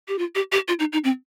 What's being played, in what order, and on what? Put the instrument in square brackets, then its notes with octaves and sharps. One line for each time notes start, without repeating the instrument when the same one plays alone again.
[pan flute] G4
F4
G4
G4
F4
D#4
D#4
C4